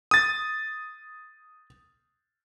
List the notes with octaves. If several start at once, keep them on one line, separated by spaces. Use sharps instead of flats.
D#6 A6